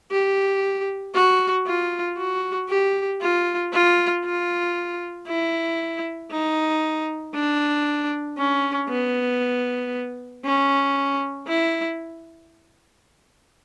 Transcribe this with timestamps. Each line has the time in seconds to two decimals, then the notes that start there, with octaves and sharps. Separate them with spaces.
0.11 G4
1.14 F#4
1.67 F4
2.18 F#4
2.69 G4
3.21 F4
3.73 F4
4.25 F4
5.28 E4
6.31 D#4
7.35 D4
8.38 C#4
8.90 B3
10.44 C#4
11.48 E4